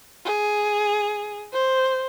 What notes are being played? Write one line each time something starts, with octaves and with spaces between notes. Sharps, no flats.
G#4
C5